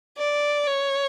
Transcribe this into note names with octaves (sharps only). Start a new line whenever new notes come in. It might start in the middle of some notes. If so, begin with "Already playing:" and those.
D5
C#5